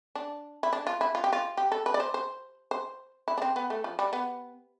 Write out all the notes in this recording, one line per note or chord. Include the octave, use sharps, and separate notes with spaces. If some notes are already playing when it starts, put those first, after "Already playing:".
D4
E4
D4
F4
E4
F4
G4
F4
G4
A4
B4
D5
C5
C5
C5
E4
D4
C4
B3
A3
F3
G3
B3